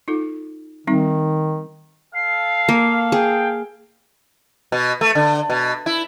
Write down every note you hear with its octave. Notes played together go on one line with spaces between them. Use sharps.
D#4 F4 A4
D#3 G3 C4 D#4
A4 F5 C7
A#3
G#4 G5
B2
A3
D3
B2
E4